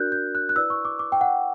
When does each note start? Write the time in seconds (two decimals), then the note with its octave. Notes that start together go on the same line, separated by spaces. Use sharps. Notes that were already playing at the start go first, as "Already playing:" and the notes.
Already playing: D4 F#4 A#4 D5 F#6 G6
0.12 G6
0.35 F#6
0.49 F#6
0.56 E4 B4 D5 E6
0.70 C#6
0.85 D6
0.99 D6
1.12 G5
1.21 F#5